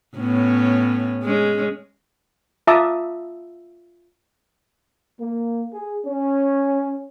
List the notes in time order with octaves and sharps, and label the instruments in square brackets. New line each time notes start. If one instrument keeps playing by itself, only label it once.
[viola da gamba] A2 B3 C#4
G#3 C#4
[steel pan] F4 E5 A5 A#5 D6 D#6
[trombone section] A#3
G#4
C#4